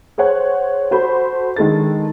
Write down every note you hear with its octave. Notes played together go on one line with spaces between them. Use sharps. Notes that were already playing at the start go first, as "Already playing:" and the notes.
G#4 C5 C#5 F#5
F#4 A4 C5 B5
D#3 G#3 D4 A4 A6